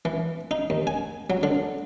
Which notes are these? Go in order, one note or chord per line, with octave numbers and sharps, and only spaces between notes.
E3
D#4
D#2
G#5
F#3
D3